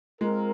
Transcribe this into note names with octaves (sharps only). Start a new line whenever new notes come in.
G#3 C4 F4 A#4